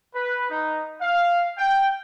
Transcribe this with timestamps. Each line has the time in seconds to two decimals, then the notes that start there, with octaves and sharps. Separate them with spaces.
0.15 B4
0.50 D#4
1.00 F5
1.57 G5